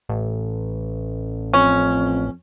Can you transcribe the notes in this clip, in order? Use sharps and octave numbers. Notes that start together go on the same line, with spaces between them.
A1
F2 C#4